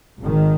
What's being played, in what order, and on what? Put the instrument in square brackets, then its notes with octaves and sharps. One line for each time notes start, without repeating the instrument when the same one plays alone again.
[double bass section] G#1 G#2 D#3